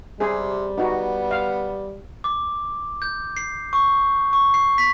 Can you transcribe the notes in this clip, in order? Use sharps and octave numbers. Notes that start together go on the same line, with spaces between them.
C3 G3 G#4
B3 D#4 F#4
F5
D6
G6
C7
C#6
C#6
C7
B6